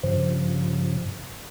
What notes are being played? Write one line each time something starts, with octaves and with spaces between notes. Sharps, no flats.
G2 C#3 F3